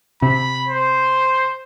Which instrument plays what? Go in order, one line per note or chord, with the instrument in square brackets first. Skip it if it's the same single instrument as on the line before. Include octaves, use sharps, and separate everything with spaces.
[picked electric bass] C3 [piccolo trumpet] B5
[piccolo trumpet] C5